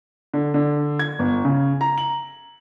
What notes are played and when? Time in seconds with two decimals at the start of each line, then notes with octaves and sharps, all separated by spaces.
0.34 D3
0.54 D3
0.99 G#6
1.19 G1
1.45 C#3
1.81 A#5
1.98 F#7